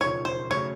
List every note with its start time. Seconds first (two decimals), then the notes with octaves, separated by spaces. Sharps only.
0.01 E1 D#2 C#3 F3 C#5
0.25 C5
0.50 C#3 F#3 A3 C#5